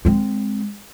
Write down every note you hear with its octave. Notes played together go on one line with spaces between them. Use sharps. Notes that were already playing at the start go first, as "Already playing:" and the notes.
G#3 C4